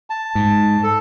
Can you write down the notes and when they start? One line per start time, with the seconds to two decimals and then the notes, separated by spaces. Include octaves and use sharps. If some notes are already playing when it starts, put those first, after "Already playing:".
0.10 A5
0.35 G#2
0.83 A4